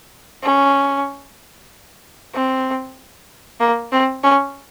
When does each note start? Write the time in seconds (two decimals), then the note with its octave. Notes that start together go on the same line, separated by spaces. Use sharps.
0.43 C#4
2.34 C4
3.60 A#3
3.92 C4
4.23 C#4